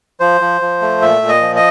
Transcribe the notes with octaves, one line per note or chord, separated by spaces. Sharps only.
F3 C5
F3
F3
A3
A#2 E5
A#2
D#5
F3
D#5